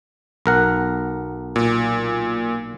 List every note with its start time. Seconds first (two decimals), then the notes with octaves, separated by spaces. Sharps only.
0.46 B1 A#4 F#5
1.56 A#2